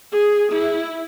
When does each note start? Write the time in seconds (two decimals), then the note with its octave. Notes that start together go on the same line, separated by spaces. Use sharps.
0.12 G#4
0.52 E4